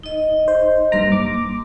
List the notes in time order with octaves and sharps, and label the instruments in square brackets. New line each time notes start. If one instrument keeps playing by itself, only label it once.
[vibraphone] D#4 D#5
[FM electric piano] C5
[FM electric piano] G2 A#5 [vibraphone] A#3 C6
[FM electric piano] D6